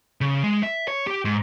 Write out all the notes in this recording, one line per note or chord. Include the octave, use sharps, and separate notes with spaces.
C#3
G#3
E5
C#5
G4
G#2